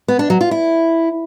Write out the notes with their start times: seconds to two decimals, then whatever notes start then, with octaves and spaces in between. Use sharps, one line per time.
0.08 B3
0.19 D4
0.30 F#3
0.41 F4
0.51 E4